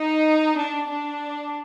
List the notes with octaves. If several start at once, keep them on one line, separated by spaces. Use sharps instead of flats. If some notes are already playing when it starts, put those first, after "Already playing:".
Already playing: D#4
D4
D4